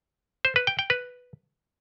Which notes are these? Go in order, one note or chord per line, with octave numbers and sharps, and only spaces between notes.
C5
B4
G5
G5
B4